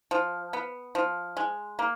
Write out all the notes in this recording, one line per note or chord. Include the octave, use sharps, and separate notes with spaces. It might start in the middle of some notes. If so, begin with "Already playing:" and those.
F3
B3
F3
G#3
A#3